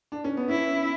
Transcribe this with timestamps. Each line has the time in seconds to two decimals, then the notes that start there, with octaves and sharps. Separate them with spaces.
0.12 D4
0.24 C#4
0.37 B3
0.49 C#4 E4